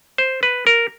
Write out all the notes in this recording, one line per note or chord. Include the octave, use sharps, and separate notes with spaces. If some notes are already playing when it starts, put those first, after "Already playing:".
C5
B4
A#4